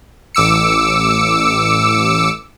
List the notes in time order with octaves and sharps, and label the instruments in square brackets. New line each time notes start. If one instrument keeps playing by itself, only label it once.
[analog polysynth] A1 D6 E6 C#7